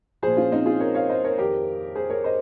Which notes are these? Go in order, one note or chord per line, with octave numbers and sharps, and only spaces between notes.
A#2 F3 G#4 C5
C#4 F4
C4 D#4
F4 G#4
A#4 C#5
C#5 F5
C5 D#5
A#4 C#5
F2 D#3 G4 A#4
G#4 C5
A#4 C#5
C5 D#5